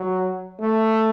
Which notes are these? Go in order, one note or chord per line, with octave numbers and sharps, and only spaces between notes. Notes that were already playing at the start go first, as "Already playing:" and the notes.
Already playing: F#3
A3